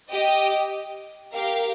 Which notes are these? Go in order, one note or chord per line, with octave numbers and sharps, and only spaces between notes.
G4 D#5 G5
G4 A#4 F5